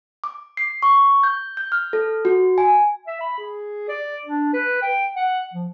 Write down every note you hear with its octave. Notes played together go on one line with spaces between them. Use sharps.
D6
C7
C#6
G6
G6
F6
A4
F#4
G#5
E5
B5
G#4
D5
D4
B4
G5
F#5
F3